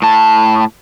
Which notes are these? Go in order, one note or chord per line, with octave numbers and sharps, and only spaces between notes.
A2 A5